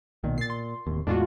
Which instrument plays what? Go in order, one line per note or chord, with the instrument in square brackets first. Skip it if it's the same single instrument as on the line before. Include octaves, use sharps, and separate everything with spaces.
[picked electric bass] B1 A#2 D#3
[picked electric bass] A#2 [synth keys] A6 C7
[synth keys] C6
[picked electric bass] D1 D#2
[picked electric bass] E2 A2 G#3 [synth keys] D4 F4 F#4